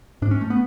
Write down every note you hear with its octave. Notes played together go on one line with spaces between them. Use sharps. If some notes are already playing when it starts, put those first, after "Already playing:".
G#2 D4
C#4
A3
B3